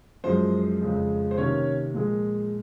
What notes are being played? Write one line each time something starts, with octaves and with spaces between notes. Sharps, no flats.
F#2 F3 G#3 C5
F2 C#3 G#3
C5
C3 D#3 A#3 C#4 C#5
A#2 F3 G#3